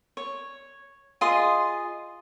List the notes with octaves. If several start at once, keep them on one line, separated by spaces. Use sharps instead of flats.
C#5
F4 G#4 D#5 C6